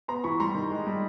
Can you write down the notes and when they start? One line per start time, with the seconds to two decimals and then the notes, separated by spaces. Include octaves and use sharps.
0.08 B3 A#5 C6
0.24 E3 B5 C#6
0.40 G3 A#5 C6
0.55 D#3
0.71 G#3
0.86 G3